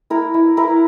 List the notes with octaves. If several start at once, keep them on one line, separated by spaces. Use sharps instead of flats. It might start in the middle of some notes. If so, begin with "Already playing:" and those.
E4 A#4
E4
E4 A#4